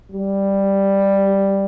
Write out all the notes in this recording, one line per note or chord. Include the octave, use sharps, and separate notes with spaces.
G3